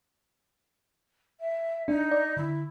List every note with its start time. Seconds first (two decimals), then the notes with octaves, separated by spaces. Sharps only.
1.40 E5
1.88 D4 D#4
2.11 D5
2.37 D3 E4